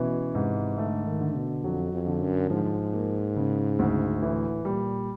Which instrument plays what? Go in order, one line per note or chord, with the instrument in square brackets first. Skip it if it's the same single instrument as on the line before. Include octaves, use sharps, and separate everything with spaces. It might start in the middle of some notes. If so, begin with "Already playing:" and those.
Already playing: [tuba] B2 [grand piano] E3 C#4
[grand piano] G#2 [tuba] C3
[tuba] D3 [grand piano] A3
[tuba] D#3
[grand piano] D3
[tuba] B2
[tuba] F2 [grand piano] F#3
[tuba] F2
[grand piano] D3
[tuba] F#2
[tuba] G#2 [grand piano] F3
[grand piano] A#3
C#3
D2
[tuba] A2 [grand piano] E3
[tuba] A#2 [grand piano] G3